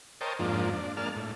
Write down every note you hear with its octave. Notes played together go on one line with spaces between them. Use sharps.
A#4 C5 C#5 D#5 G5 A5
F2 G#2 F3 A#3 D4
D4
G#3 A#3 D4 A5 F6
A2